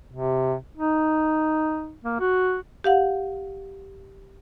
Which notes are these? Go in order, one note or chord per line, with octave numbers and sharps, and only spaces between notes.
C3
D#4
A#3
F#4
G4 F5 F#5